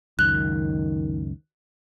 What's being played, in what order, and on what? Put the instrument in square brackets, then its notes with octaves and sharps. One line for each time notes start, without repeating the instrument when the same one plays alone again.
[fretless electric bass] C#2 F#2 [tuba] D#3 [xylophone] F#6